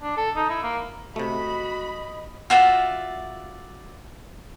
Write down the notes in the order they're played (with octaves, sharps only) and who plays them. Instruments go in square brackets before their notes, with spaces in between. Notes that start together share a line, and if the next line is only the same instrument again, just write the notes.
[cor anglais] D4
A4
D#4
E4
A#3
[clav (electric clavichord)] C3 A3 [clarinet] F#4 [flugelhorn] D#5 [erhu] B5
[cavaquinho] F4 F#4 D5 E5